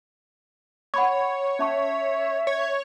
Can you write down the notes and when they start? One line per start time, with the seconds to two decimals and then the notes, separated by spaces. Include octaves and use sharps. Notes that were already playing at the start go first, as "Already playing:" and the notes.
0.94 C#5 F#5 B5 C#6
1.59 C#4 E5 A5 C#6
2.47 C#5